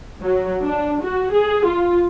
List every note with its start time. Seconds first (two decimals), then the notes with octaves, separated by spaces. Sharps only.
0.24 F#3
0.65 D4
1.03 F#4
1.33 G#4
1.67 F4